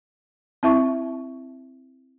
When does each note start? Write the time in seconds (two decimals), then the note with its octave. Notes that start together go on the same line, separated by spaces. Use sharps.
0.63 C4 E4 E5 A5 C#6